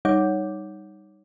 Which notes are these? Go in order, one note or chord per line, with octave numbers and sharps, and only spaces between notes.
G3 D#4 C#5 F#5 D6 G6